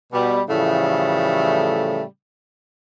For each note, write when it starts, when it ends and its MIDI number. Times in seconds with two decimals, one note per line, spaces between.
0.13 0.41 47
0.13 0.41 55
0.49 2.03 45
0.49 2.03 49
0.49 2.03 52
0.49 2.03 53
0.49 2.03 55
0.49 2.03 57